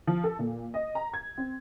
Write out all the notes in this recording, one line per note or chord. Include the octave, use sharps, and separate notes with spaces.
F3
A4
A#2
D#5
A#5
G#6
C4